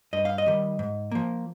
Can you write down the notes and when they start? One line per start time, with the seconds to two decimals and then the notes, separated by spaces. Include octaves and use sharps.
0.13 G2 D#5
0.25 F5
0.38 D#5
0.46 D#3 G3
0.79 G#2
1.12 F3 A#3